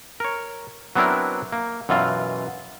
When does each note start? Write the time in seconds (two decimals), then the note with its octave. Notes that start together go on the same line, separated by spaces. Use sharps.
0.20 A#4 C#5
0.95 F#3 B3 C4 D4 E4 A#4
1.52 A#3
1.89 F#2 B2 E3 F4 F5